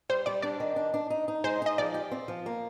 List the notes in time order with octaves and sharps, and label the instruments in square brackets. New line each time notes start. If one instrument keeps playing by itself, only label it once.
[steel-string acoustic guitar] G3 [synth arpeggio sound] C5
[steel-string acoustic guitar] G3 [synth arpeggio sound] D5
[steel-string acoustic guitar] D4 [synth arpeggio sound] D5
[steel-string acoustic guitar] D#3
D4
D4
D#4
D#4
[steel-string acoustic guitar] G#3 [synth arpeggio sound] C5
[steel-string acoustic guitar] D#4 [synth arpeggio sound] D#5
[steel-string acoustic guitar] F3 [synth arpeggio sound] D5
[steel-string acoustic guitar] G4
C4
F3
A#3